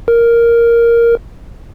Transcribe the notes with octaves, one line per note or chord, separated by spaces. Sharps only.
A#4